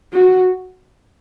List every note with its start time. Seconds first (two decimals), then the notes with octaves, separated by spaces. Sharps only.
0.13 F#4